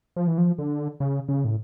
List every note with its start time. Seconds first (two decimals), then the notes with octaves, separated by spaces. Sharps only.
0.16 F3
0.27 E3
0.38 F3
0.58 D3
1.00 C#3
1.29 C#3
1.45 A2